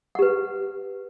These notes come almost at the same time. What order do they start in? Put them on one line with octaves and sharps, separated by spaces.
F#5 G4 B4